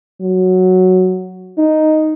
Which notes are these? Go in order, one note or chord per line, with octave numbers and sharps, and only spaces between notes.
F#3
D#4